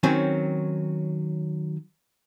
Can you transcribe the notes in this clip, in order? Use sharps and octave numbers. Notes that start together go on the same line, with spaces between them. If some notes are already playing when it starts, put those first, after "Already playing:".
D#3 F#3 C4 C#4